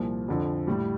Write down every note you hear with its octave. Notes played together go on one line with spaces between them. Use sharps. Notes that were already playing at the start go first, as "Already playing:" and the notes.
Already playing: C2 A#2 F3
F2 D3 F3
A2 G3